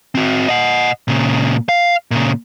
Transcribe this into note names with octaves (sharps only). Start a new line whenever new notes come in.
C4 F#4
D#5 F#5
A#2 C#3
F5
A#2 C#3